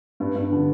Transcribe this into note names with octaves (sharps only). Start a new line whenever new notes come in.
G2
G2
D3